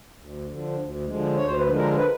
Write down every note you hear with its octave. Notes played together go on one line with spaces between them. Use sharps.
D2
D3 F3
D2
D3 F3 G#3
D2 C#5
C5
B4
D3 F3 G#3
A#4
B4